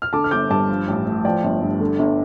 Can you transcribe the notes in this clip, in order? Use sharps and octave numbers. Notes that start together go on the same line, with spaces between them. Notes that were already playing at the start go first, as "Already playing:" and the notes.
F6
D3 A5 D6
F6
G1 D6 G6
G2 A5 D6
F3
A1
A2
F3 D5 G5
G1
G2
D3
G1